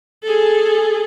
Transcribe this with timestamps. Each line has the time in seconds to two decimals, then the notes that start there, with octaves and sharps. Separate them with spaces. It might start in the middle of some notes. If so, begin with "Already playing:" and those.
0.23 G#4 A4